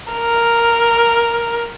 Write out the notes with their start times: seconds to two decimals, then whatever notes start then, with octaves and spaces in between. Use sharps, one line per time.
0.13 A#4